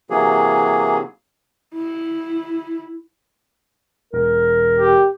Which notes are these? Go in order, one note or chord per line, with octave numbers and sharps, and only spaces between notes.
C3 E3 F#3 A#3 G#4
E4
E1 A#4
G4